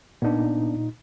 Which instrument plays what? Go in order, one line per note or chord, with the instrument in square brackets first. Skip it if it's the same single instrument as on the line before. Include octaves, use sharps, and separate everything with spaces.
[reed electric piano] A#2 D#4 [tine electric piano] B3 D4